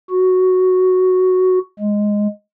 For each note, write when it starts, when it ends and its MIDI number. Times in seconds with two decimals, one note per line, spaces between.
0.10 1.59 66
1.79 2.27 56